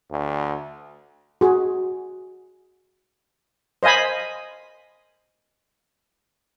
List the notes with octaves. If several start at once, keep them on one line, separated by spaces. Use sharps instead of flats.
D2
F#4 G#4
C5 D#5 F5 G#5 B5